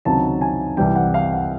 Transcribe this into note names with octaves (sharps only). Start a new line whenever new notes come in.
C#2 C3 D#3 F#3 A5
G#5
C2 C3 E3 G3 G5
F#5
F5
F#5